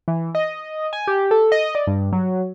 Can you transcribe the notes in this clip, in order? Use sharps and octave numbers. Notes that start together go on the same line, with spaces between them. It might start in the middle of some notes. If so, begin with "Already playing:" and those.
E3
D#5
G#5
G4
A4
D#5
D5
G2
F#3